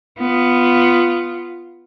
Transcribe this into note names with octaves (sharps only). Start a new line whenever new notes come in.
B3 F4